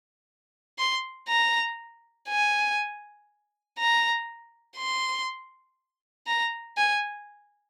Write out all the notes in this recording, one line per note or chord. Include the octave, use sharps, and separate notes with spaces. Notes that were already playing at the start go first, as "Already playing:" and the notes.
C6
A#5
G#5
A#5
C6
A#5
G#5